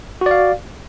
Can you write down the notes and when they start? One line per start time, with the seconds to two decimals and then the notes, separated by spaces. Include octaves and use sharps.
0.21 F#4
0.26 D5
0.31 F5